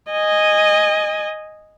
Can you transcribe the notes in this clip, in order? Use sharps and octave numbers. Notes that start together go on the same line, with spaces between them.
D#5 G#5